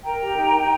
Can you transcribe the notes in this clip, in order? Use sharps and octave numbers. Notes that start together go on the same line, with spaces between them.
A#4 G5 A#5
G4
D#4
D#4